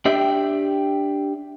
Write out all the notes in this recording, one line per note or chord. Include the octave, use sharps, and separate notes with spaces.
D4 G4 E5 G5